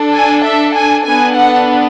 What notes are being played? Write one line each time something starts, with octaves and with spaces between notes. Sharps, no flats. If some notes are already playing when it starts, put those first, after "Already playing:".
Already playing: D4 A4
G#5
E5
G#5
B3 D4 A4 G#5
F#5